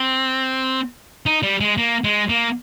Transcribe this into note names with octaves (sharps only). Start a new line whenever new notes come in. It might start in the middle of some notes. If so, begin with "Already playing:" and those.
Already playing: C4
D#4
G3
G#3
A#3
G#3
A#3